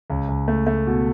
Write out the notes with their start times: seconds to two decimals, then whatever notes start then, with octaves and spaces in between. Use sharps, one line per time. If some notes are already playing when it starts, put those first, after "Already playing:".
0.10 C#2
0.28 C#2
0.48 A3
0.67 A3
0.87 B2